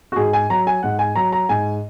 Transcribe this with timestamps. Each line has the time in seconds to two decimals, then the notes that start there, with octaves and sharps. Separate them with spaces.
0.12 F#4
0.16 G#2 G#4
0.33 G#5
0.50 F#3 A#5
0.67 G#5
0.83 G#2 F#5
0.99 G#5
1.16 F#3 A#5
1.33 A#5
1.49 G#2 G#5